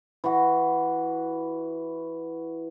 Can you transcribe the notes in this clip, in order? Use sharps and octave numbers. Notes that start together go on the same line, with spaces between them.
E3 F#4